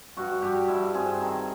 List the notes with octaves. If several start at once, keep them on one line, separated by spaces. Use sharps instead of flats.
G2 F#4
G2 G4
G2 E4
C4 G#4
D#3